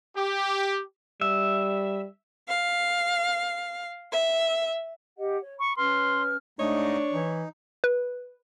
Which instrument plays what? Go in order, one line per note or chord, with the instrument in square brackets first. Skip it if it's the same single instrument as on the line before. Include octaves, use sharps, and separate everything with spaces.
[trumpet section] G4
[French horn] G3 [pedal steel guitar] E5
[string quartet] F5
E5
[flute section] G4 D#5 F#5
C#5
[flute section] B5 [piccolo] C#6
[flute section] C#4 B4 F6 [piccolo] C6
[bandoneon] G#2 D#4 D#5 [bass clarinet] A3 [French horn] D4 [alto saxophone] C#5
[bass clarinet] E3 [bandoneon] D#4
[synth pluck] B4